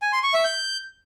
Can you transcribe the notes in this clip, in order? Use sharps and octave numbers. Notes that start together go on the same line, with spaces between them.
G#5
C6
C#6
E5
G6